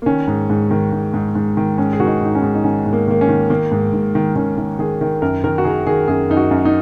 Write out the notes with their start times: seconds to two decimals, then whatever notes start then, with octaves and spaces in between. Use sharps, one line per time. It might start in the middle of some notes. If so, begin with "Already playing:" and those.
0.02 A#3
0.06 D#3 C#4
0.28 G#2
0.50 G#2
0.71 D#3
0.93 G#2
1.14 G#2
1.35 G#2
1.57 D#3
1.78 G#2 C#4
1.93 G#4
2.00 D#3 F#4
2.06 D#4
2.21 G#2 D#4
2.35 C#4
2.43 G#2
2.54 D#4
2.64 D#3 C#4
2.86 G#2
2.93 A#3
3.07 D#3 A#3
3.21 C#4
3.29 D#3
3.50 D#3 A#3
3.72 G#2
3.93 G#2
4.15 D#3
4.36 D#3 C#4
4.58 D#3
4.79 D#3 G#4
5.01 D#3
5.22 F#2 A#4
5.44 D#3 A#4
5.58 F#4
5.64 D#3 G#4
5.87 D#3 G#4
6.08 F#2 G#4
6.30 F#2 D#4
6.37 F#4
6.51 F#2
6.65 D#4